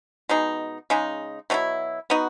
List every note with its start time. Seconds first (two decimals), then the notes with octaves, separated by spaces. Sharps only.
0.29 B2 G#3 D#4
0.90 C#3 G#3 D#4
1.50 B2 F#3 A3 E4
2.10 B3 D#4 F#4